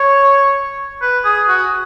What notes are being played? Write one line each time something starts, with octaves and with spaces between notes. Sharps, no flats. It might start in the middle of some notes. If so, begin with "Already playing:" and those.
Already playing: C#5
B4
G#4
F#4